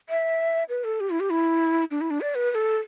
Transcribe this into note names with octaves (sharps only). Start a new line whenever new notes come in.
E5
B4
A4
G4
E4
G4
E4
D4
E4
D4
D5
B4
B4
A4